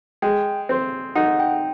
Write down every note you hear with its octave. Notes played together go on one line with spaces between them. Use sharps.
G#3 G5
C4
D#4 F#5
G5